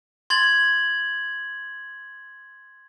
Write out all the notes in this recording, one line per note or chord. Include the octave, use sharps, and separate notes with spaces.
C6 G#6 A6 F#7